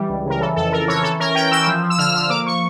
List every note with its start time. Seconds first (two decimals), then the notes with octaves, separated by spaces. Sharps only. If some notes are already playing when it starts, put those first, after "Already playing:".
Already playing: E3 G3
0.09 C#2
0.25 C#3 A#4
0.41 E3 A4
0.56 F2 A4
0.72 F2 A#4
0.88 E3 C#5
1.03 E3 A4
1.20 C#4 A#4
1.35 C#4 G5
1.51 E3 E6
1.67 F3
1.83 F3
1.90 E6
1.98 D3 F6
2.15 F3 E6
2.30 A#3 D6
2.47 C#6